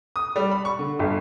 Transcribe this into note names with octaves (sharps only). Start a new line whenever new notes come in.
D#6
G3
B5
C#6
D3
G1